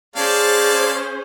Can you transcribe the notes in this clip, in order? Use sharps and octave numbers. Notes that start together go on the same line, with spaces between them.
C#4 G#4 C5 D5 F5 A5